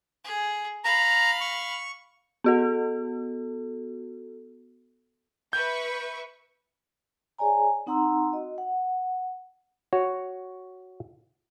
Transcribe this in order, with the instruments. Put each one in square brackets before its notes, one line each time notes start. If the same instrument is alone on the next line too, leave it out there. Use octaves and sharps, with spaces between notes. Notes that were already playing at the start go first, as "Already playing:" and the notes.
[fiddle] G#4
[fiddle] F5 B5 [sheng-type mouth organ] A#5
[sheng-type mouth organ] C#6
[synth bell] B3 F#4 A4
[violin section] B4 E5 C#6 [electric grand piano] G6
[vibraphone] G#4 C#5 D5 G#5 A#5
C4 D#4 F#5 A#5 C6 E6
F#4 D#5
F#5
[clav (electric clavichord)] F#4 C#5